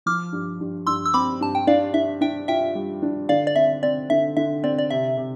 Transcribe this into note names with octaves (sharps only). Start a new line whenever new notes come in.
F3 D6 F6
G2
G2
G2 C6 E6
E6
C4 B5 D6
G2 A5
G5
D4 D5 F5
D4 E5
D4 E5 G5
F4 E5 G5
G3
D4
D3 D5 F5
D5
C4 E5
C4 D5
D3 E5
D3 E5
C4 D5
D5
C3 E5
C3